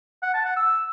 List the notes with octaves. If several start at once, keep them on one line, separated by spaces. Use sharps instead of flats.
F#5
A5
F#5
E6